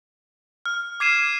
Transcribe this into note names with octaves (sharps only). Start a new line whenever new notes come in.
F6
D6 G#6 C7 D#7 E7